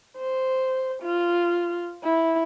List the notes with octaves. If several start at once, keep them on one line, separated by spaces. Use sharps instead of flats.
C5
F4
E4